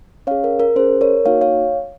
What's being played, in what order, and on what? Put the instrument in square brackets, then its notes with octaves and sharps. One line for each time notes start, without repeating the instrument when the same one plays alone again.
[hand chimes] C#4 G#4 C#5 F5
A#4
A#4
C#4 G#4 C5
A#4 C#5
A#3 D#4 F#4 C#5 F5
C#5 F5